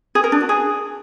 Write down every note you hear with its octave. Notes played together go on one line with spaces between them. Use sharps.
G#4
A#4
D4
F#4
G#4